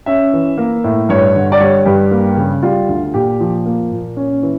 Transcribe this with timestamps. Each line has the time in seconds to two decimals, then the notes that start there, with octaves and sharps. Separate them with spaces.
0.06 C#4 E5
0.33 E3
0.58 A#3
0.84 A2
1.09 G2 C#5
1.35 D3
1.52 D5
1.60 G3 C#5
1.86 G2 G4
2.11 A#3
2.37 C#3
2.63 G3 F4
2.88 D2
3.14 A#2 G4
3.40 F3
3.66 A#3
3.91 A#2
4.17 C#4
4.42 E3